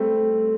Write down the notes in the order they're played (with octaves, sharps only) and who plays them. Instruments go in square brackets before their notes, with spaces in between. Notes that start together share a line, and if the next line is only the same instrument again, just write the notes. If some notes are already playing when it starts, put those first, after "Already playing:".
Already playing: [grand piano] G3 A3 C4